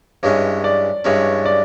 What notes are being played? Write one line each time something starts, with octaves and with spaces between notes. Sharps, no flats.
G2 E3 G#3 C#4 C#5
D5
G2 E3 G#3 C#4 C#5
D5